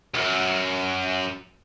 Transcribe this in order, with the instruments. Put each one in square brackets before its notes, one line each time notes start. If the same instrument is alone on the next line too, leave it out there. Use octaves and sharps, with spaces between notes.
[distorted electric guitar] C#2 F#2